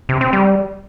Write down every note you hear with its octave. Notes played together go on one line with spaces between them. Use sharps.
C3
C4
G3